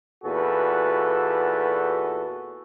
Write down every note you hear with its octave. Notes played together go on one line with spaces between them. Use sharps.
E2 A#2 F#4 A4 B4